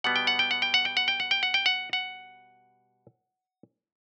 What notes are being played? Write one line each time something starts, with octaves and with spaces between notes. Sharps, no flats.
B2 G3 B3 F#5
G5
F#5
G5
F#5
G5
F#5
G5
F#5
G5
F#5
G5
F#5
G5
F#5
F#5